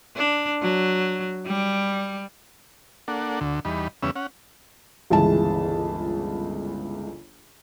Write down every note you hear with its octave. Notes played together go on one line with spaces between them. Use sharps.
D4
F#3
G3
A#3 D4 A4 F#5
D2 D3
E2 G3 D#4 B5
E2 C#3 G3 B3 C#4 E6
C#4 F#5
G1 C#2 E3 G#3 A5